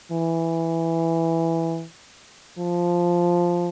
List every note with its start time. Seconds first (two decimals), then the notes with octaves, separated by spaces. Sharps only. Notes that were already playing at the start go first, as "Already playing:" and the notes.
0.12 E3
2.58 F3